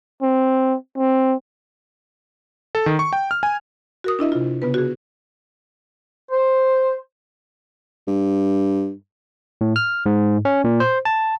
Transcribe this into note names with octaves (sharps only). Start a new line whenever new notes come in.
C4
C4
A4
D#3
C#6
G5
F6
G#5
F#4 A#4 D#6
D4 E4 D#5 E5
C3 F4
C#3 B3 B4
F#4 G#4
C5
G2
A2
F6
G#2
C#4
A#2
C5
A5